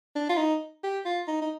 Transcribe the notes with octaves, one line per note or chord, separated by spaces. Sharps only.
D4
F4
D#4
G4
F4
D#4
D#4